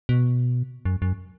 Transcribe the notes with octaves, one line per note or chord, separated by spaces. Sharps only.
B2
F#2
F#2